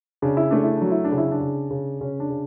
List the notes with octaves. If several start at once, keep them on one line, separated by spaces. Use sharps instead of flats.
C#3 D4
E4
A3 D4
E4
F#3 D4
E4
D4
C#3
E4
D4
C#3
C#3
C#3 C#4
D4
C#3